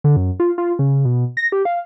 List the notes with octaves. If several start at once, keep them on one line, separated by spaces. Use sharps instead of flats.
D3
F#2
F4
F4
C#3
B2
A#6
G4
F5